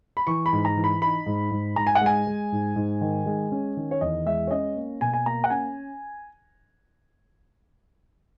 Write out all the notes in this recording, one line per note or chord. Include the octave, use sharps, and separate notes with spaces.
B5
E3 C#6
B5
G#2
A#5
E3
B5
D#4 B5
G#2
G#2
G#2 A#5
G#5
F#5
G#3 G#5
G#3
G#2
G#2
D#3
G#3
C#4
D#3
C#5
E2 D#5
G#3 E5
C#5
C#4 D#5
A#3
B2 G#5
G#5
A#3 A#5
F#5
C#4 G#5